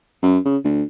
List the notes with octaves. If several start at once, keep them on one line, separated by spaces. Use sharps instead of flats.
F#2
C#3
D2